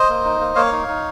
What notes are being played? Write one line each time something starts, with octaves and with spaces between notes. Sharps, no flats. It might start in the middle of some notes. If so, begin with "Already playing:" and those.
Already playing: C5 D#5
A#3
D#4
A#3
A#3 C#5 F5
D#4
D#4